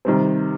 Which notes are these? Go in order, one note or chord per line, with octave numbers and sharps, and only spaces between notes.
C3 D#3 G3 C4